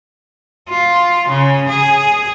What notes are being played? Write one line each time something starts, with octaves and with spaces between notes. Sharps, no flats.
F4
C#3
G#4